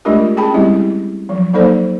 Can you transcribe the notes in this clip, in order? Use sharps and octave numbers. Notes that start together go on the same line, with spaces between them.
G#3 A3 D4 F4 G4 A#4
C#4 G#4 G5 A5 B5
G3 G#3 C4 E4 G4
F3 F#3
F#3 A#3 D#4 A4 C5 D5